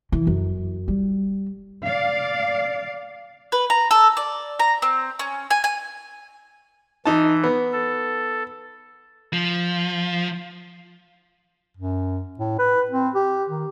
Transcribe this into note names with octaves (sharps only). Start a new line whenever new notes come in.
E3
F#2
G3
D5 F5
B4
A#5
A4
D5
A#5
C4
C#4
G#5
G#5
E3 D#4 A5
B3
A4
F3
F#2
A2
B4
C4
G4
D#3